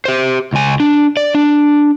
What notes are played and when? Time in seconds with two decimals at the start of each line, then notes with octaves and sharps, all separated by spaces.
0.05 G4 C5
0.53 C#2 G#5
0.80 D4
1.17 D5
1.35 D4